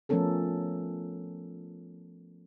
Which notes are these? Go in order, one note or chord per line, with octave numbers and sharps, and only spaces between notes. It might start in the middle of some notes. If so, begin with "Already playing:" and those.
F3 A3 B3 C#4 A4 A#4